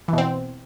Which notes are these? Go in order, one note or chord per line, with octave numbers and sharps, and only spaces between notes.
B2 E3 C4